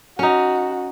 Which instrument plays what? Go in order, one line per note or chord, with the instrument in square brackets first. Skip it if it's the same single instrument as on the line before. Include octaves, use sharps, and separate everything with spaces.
[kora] C#4 D#4 [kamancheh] F#4